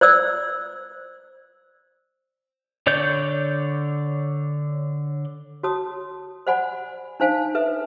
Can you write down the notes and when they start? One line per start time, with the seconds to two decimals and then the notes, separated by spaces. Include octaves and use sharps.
0.01 C5 D5 E6
2.87 D3 C#5 D5 G6
5.63 F#4 C#5 A5 D#6
6.47 C5 D5 F#5 G#5 B5
7.20 D4 D#4 C5 F5 G#5 A5
7.55 A4 B4 E5